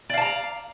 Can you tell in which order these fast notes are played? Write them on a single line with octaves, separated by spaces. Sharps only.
D5 F5 A5 A#5